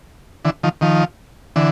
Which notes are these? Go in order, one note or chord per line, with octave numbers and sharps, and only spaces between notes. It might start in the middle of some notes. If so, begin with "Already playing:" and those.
D3 E3
D#3 F3
D#3 F3
D3 E3